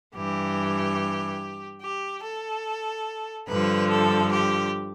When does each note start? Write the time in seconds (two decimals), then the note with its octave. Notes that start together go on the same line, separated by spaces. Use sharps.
0.16 G2 E3 G4
1.82 G4
2.23 A4
3.49 G2 D3 F3 B4
3.90 A4
4.32 G4